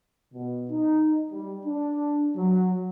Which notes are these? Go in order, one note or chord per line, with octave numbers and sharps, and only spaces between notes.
B2
D#4
G3
D4
F#3